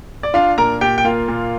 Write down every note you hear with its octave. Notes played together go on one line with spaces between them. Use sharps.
D5
D4 F4 F5
A#2 A#4 A#5
A#2 G4 G5
G5
A#3 F4 F5
A#2